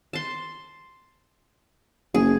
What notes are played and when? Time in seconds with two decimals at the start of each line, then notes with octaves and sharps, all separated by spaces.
0.13 A5 C6
2.15 F#1 G#4